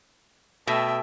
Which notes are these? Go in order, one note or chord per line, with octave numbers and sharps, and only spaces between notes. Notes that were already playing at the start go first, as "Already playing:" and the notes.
B2 A3 E5 G5